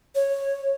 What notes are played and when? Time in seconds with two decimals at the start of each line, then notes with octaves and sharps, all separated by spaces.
0.15 C#5